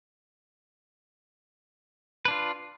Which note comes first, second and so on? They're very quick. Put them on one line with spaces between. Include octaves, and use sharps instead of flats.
B4 D4 F4